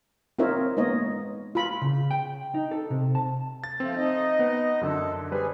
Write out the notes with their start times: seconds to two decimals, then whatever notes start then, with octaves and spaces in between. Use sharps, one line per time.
0.39 C4 D#4 F4 A#4 C#5 E5
0.77 G#3 A#3 B3 D#4 C#5 D#5
1.55 F4 B5
1.82 C#3
2.11 G5
2.54 D#4
2.71 A4
2.90 C3
3.15 A5
3.64 A6
3.80 F3 A3 C4
3.97 D#4 D#5
4.39 B3
4.81 F#2 D3 A4
5.32 G3 G#4 B4 C5